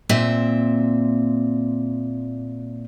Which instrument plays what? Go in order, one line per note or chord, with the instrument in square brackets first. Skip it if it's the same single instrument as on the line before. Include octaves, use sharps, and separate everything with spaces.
[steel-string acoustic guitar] A#2 C4 E5